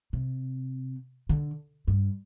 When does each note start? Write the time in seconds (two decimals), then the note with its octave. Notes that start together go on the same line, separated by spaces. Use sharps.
0.13 C3
1.29 D3
1.88 G2